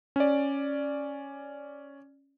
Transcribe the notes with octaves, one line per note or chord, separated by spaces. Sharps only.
C#4 D5